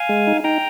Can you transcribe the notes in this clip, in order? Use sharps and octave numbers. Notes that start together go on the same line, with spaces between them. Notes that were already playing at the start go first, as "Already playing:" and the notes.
Already playing: F5 G#5
G#3
D#4
D#4 G5 A#5